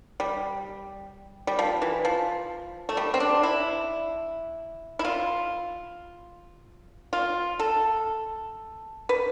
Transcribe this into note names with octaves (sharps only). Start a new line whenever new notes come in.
G3
G3
F3
E3
F3
A3
G3
C4
D4
E4
E4
F4
F4
A4
B4